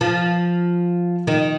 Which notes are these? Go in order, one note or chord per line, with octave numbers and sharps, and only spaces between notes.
F3
D#3